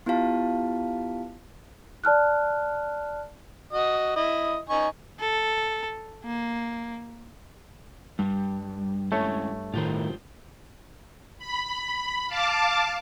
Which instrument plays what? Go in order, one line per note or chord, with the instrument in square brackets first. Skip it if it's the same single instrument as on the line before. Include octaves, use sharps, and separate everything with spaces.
[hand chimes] B3 E4 F4 G4 F5 A5
[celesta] D5 A5 F6 F#6
[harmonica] F#4 D#5 D#6
E4 D#5
D#4 G#5 C#6
[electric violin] A4
A#3
[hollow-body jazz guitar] G2 [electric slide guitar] G3
[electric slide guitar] G#3 C#4 E4 [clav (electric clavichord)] A3 C#5
[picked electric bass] A2 D#3 [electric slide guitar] F4 G4 C5
[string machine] B5
F5 A5 D6